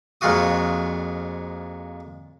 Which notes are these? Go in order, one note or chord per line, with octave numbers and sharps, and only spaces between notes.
F2 A#2 G#3 F4 F#4 D#6